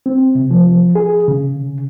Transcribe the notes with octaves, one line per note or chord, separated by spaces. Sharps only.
C4
C3
F3
G#4
C#3